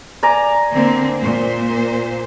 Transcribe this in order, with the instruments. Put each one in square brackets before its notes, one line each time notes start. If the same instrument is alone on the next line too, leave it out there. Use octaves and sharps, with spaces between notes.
[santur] D5 G#5 A#5
[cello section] D3 A#3 C4
A#2 C5